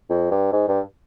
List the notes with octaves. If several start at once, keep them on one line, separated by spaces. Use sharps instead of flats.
F2
G2
G#2
G2